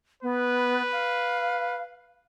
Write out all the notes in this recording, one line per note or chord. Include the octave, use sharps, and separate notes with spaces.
B3 B4
F5